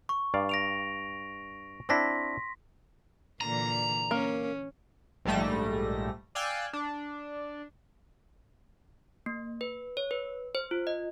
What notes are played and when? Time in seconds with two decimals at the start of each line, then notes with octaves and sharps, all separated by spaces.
0.09 C#6
0.34 G2 D5 F5
0.49 A#6 D7 F7
1.89 C4 D4 E4 C6 A#6 B6
3.41 A#2 D3 E3 A#5
4.11 A#3 C#4
5.25 A#1 G#2 G3 A3 A#6
6.35 D5 F5 G5 G#5 E6 F#6
6.73 D4
9.26 A#3
9.61 B4
9.97 C#5
10.11 B4
10.55 C5
10.71 F4
10.87 D#5